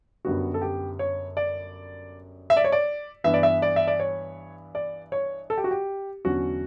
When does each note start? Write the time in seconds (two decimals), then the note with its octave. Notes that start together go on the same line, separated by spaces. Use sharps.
0.25 F#2 D3 G3 B3 F#4
0.54 A4
0.62 G4
0.99 C#5
1.37 D5
2.50 E5
2.57 D5
2.64 C#5
2.72 D5
3.24 G2 E3 B3 E5
3.34 D5
3.43 E5
3.62 D5
3.76 E5
3.87 D5
4.00 C#5
4.75 D5
5.12 C#5
5.50 A4
5.57 G4
5.64 F#4
5.71 G4
6.25 E2 D3 F#3 C#4 F#4